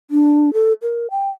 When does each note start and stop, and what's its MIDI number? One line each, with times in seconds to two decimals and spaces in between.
0.11 0.53 62
0.54 0.73 69
0.82 1.07 70
1.11 1.30 79